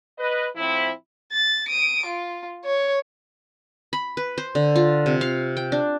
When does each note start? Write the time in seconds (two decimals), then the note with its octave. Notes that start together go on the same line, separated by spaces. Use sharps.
0.19 B4 D#5
0.56 A2 F3 C4 E4
1.33 A6
1.69 D#6 D7
2.06 F4
2.65 C#5
3.93 B5
4.17 B4
4.38 C5
4.55 D3
4.76 F4
5.06 C3
5.21 F5
5.57 G5
5.72 D4